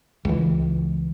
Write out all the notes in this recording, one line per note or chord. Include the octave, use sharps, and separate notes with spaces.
C#2 E3